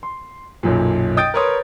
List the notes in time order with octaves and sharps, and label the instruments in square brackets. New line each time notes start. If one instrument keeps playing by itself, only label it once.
[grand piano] C6
B1 F#2 A#2
D#5 G5 D#6 G6 A6 D7
A#4 B4 C#5 C6 D#6